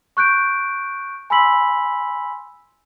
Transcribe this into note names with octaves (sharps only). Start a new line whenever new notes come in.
C#6 F#6 G6 D7
G#5 B5 C6 E6 B6 F#7